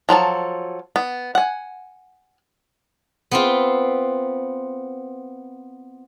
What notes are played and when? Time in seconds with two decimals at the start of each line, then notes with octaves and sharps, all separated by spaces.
0.09 F3 F#3 A4 A5
0.96 B3
1.35 F#5 G#5
3.31 B3 C4 F4